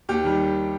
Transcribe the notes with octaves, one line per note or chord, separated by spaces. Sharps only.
D#2 G4
D#3 G3